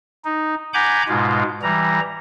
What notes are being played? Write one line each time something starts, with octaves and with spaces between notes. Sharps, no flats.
D#4
F#5 G#5 A#5 B5 D6 G6
G#2 B2 G#3 F4
E3 G3 A#5